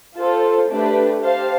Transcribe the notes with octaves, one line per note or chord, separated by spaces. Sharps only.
F4 A4 C5
A3 D4 G4 B4
G4 C5 F5 A5